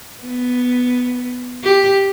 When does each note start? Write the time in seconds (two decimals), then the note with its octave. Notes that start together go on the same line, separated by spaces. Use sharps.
0.23 B3
1.63 G4